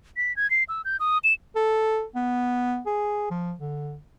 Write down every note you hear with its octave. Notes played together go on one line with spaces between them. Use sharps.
B6
G#6
C7
E6
G6
D#6
E7
A4
B3
G#4
F3
D3